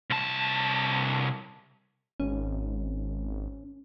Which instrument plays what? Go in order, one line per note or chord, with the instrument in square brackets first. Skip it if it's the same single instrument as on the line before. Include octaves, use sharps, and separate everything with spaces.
[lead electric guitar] C2 A5
[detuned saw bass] G#1 [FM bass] C#4